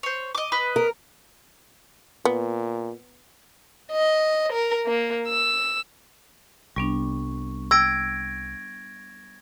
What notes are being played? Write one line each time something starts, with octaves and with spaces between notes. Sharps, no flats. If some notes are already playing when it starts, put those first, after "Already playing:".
C5 C#5
D#5 D6
B4 D#5
A#4
A#2 B3
D#5
A#4
A#3
E6
C2 G3 B3 D4 C#6
G5 E6 G#6 A#6 D7